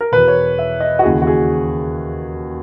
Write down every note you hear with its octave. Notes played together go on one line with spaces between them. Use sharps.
A#4
E2 B2 B4
C#5
E5
D#5
F#4
D#2 C#3 E3 G#4
F#4
G#4